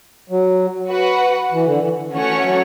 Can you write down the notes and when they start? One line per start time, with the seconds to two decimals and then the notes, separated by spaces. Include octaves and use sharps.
0.30 F#3
0.91 F#4 B4 F#5
1.52 E3
1.66 D3
1.79 E3
2.13 E3 A3 C#4 F#4 C#5 F#5
2.28 E3
2.43 F#3